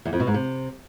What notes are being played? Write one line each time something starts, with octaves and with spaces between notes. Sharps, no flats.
E2
F2
B2
G#2
C3